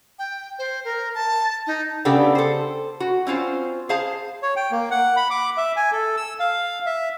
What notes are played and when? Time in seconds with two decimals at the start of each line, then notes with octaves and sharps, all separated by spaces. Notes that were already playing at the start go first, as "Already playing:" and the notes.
0.19 G5
0.59 C5
0.85 A#4
1.15 A5
1.67 D#4
2.05 C#3 B3 D4 G4 A4 G5
2.35 A4 C5
3.00 F#4
3.27 C4 C#4 F4 C5
3.89 G#4 C5 F5 A5
4.42 C#5
4.56 G5
4.71 A#3
4.91 F#5
5.17 B5
5.30 D6
5.57 E5
5.76 G#5
5.92 A4
6.17 E6
6.40 F5
6.86 E5